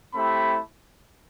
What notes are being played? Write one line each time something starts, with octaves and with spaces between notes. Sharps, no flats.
A3 C4 E4 G4 B5